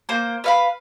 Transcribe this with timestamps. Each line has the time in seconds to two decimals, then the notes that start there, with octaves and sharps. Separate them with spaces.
0.09 A#3 C5
0.44 B4 F5 B5